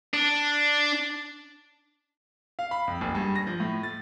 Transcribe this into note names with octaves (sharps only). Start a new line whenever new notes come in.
D4
F5
B5
F2
F#1
G2
A#6
F3
A2
A6